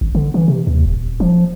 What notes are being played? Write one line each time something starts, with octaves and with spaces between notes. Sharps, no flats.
G#1
D3
E3
C3
D#2
D#1
F3